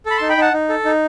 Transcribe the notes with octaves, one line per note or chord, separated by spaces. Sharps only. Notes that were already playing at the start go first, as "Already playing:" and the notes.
A4 B5
D#4 A5 C6
G5 B5
D#4 F#5 A5
D#4
A4
D#4